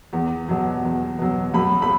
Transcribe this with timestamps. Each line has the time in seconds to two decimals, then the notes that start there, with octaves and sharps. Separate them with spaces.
0.13 E2
0.49 B2 F#3
0.84 E2
1.18 B2 F#3
1.54 F#2 B5
1.82 B5